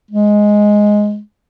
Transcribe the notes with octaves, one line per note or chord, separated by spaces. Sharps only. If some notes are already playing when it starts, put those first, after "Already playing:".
G#3